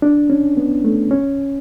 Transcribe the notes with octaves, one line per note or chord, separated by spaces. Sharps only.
D4
C#4
B3
A3
C#4